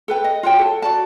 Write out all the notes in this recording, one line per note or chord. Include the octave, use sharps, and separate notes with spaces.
A4 B4 G5
D#5
F4 F#4 C#5 G5
A4 A5
F#4 D5 A5